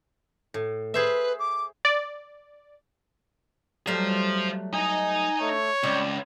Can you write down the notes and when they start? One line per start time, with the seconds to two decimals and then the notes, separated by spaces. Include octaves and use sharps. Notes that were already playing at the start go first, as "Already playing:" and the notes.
0.54 A2
0.94 G#4 B4 C5 E5
1.39 D6
1.85 D5
3.87 F#3 G3 A3 C5 F5
4.73 D#4 D#5 G#5
5.41 A3 C#5
5.83 C#2 C4 D5